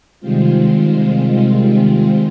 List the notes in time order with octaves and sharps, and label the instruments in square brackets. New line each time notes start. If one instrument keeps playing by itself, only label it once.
[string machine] C3 D#3 G3 G#3 C4 F4